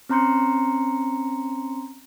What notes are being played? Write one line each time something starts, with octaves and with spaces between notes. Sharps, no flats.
C4 C#4 A#5 C6 G6 C#7